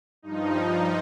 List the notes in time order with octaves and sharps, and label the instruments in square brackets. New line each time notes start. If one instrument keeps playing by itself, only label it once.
[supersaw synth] G2 F3 D#4